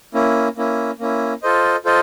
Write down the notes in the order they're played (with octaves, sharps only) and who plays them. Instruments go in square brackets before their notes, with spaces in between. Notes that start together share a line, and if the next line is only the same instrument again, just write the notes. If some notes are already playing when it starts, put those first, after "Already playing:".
[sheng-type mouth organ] A#3 C#4 E4
A#3 C#4 E4
A#3 C#4 E4
F4 A4 C5 D#5
F4 A4 C5 D#5